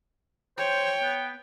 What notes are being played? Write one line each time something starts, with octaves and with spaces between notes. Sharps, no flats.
C5 C#5 G5
B3